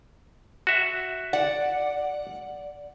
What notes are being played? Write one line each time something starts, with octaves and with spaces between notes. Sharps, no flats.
F#4 E5
D5 F#5